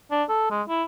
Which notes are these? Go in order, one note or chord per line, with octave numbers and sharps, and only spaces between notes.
D4
A4
G#3
E4